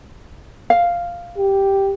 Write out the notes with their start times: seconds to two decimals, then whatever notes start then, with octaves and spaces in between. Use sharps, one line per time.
0.70 F5
1.38 G4